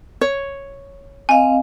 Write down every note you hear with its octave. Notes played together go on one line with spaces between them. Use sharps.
C#5
C4 D#5 F5 G#5